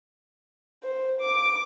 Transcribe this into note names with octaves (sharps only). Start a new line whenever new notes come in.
C5
D6